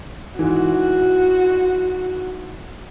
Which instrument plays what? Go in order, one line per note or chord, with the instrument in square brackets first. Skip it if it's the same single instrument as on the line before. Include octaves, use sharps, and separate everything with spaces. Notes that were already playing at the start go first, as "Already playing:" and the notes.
[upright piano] G#2 E3 [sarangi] F#4